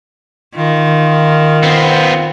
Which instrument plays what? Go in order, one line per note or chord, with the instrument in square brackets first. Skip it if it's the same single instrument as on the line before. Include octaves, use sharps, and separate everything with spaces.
[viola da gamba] D#3 [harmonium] F4
[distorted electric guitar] B3 C4